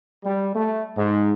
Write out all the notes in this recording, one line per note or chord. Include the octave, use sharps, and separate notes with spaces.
G3
A3
G#2